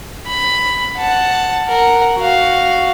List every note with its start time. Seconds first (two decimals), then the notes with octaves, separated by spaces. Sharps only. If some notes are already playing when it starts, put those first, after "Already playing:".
0.27 B5
0.97 F#5 A5
1.68 A#4 F#5
2.16 F#4 F5